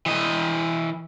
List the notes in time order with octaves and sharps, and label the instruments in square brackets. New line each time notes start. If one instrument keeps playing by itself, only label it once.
[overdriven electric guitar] E3 D#5